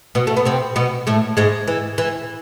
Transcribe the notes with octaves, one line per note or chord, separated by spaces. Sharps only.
B2 B3
A3
B3
C3 C4
B2 B3
A2 A3
G#2 G#3
E3
E3